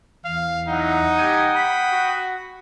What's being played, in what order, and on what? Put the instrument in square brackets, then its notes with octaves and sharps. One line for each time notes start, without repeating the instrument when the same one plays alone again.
[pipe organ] E2 [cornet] F5
[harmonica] F#3 E4 [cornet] D#4 [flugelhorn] F#5
[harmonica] G3 G#5 [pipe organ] G5 D#6
[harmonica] B5
[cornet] F#4